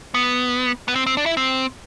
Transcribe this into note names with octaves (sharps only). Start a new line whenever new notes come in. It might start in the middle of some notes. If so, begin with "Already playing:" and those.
B3
B3
C4
C4
D4
E4
C4